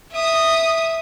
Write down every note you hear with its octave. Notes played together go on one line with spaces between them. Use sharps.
E5 D#6